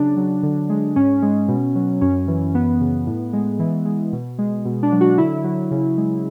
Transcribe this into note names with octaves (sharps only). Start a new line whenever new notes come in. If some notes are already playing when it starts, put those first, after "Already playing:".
Already playing: C#3 F#3 D4
F#3
D3
G#3
G#2 C#4
G#3
B2
F#3
F#2 C#4
E3
F#2 B3
C#3
A2
G#3
E3
G#3
B2
G#3
B2
D4
F#3
F#4
D3 E4
F#3
C#3
G#3